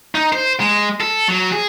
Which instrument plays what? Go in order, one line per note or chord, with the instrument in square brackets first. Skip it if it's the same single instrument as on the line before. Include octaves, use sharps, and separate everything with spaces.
[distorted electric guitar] D#4
C5
G#3
A4
F#3
G#4